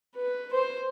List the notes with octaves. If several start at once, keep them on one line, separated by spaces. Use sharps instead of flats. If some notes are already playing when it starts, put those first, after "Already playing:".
B4
C5